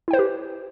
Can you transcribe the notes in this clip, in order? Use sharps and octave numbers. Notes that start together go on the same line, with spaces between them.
E4 G4 B4 C5 G5